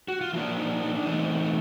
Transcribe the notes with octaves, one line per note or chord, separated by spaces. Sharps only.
F#4
F4
F3 A#3 D4 E4
D#4
D#4
D4
E3 A3 C4 D#4